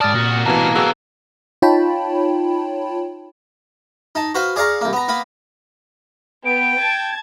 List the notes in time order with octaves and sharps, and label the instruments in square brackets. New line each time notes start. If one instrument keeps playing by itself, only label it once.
[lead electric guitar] G#2 A5 [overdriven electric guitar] D5 [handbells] D#6 F6 A6
[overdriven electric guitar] C2 F#4 [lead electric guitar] A#2
[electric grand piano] A1 B2 E3 [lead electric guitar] F5 A#5 [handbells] A5
[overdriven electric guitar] D3 F#3 [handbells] B3 B4 E6 [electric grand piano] F#4 G#4
[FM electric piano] D#4 F4 C#5 G5 A5 B5
[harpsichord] D#4 A5
F#4 B4 C5 F5
G#4 D5 F5 A#5 C#6
C2 A#3
B3 A#5
A#3 B3 B5
[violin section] B3 [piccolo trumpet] G5 [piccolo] D7
[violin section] A5 G#6